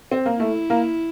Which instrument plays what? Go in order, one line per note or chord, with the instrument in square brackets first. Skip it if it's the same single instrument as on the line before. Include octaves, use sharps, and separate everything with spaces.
[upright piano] C4
A#3
[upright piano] A3 [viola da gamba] E4
[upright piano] A#3